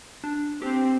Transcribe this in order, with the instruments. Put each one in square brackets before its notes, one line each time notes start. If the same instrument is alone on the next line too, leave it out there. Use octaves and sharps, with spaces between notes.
[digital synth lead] D4
[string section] C4 [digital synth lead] G4